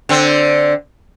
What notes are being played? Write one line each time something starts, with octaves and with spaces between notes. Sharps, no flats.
D3 C4